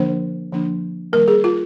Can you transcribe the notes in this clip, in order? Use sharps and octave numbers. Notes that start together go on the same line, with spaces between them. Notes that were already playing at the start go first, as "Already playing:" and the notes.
Already playing: D3 F3 A#3 D4 C5
D3 F3 A#3 D4
D#3 G3 A#3 A#4
G#4
F4